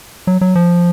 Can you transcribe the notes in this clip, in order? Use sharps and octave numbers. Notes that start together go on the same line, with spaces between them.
F#3
F#3
F3